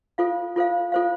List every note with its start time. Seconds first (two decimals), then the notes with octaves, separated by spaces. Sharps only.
0.18 F4 A4 C5 F5
0.56 F4 A4 C5 F5
0.92 F4 A4 C5 F5